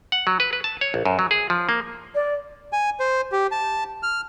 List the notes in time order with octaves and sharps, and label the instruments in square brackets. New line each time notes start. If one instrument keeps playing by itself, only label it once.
[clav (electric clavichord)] F#5
F#3
B4
B4
A5
C#5
A#1
F#2
F#3
G#4
F3
A#3
[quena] D5
[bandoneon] G#5
C5
G4
A5
F6